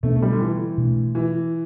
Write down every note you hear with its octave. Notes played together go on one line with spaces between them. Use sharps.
B2 A3 B3 D4
A3
G3
D3
E3
B2 A3 D4
E3